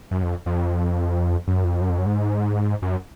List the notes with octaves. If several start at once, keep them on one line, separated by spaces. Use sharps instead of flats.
F#2
F2
F2
F#2
F2
F#2
F2
F#2
G#2
F#2